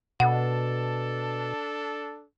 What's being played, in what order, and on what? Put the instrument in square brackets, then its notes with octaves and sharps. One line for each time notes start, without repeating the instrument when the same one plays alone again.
[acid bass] B2 [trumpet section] D4 A4 [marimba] F#5